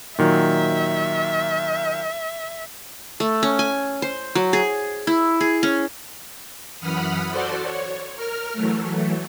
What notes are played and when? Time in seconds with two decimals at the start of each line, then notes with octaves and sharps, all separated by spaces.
0.18 A#2 D#3 F#3 E5
3.20 A3
3.43 C#4
3.59 G#5
4.02 C5
4.35 F#3
4.53 G#4
5.07 E4
5.41 G#4
5.63 C#4
6.80 F#2 E3 F#5 B5 D#6 F6
7.31 F#4 A4 C5 D5 C6
7.64 C#5
8.16 A#4 F6
8.53 E3 F#3 A3